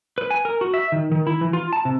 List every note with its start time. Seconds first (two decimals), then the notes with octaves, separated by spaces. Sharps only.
0.18 B4
0.31 G#5
0.45 A#4
0.61 F#4
0.74 E5
0.92 D#3
1.12 D#3
1.27 E4
1.41 E3
1.53 F4
1.73 A5
1.85 C3